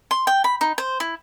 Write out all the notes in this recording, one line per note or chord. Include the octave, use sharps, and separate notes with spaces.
C6
G5
B5
D#4
C5
E4